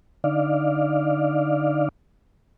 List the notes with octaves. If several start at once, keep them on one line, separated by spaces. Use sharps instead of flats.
D3 D#4 D5 F5